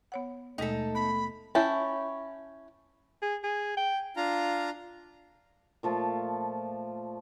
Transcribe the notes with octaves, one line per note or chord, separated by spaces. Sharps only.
B3 C#5 F#5
D#2 B2 G#3 A3 D#4 A4
B3 B5
C#4 E4 G5 A5
G#4
G#4
G5
D4 F4 F5 A#5
A#2 F3 A3 A5